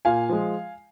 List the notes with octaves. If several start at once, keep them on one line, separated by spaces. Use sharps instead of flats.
A#2 F5 G#5
F3 G#3